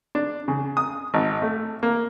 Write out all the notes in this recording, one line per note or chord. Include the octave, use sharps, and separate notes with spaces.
D4
C#3
D#6
G#1
A3
A#3